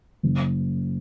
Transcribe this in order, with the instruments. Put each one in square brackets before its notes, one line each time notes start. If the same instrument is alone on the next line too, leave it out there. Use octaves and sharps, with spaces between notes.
[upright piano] F#1